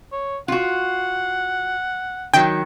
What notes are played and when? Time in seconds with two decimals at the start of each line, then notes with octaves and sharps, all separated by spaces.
0.12 C#5
0.48 F4 F#4 F#5
2.34 D#3 F#3 G5